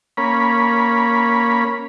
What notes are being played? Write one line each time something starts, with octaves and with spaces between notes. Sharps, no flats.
A#3 C#4 B5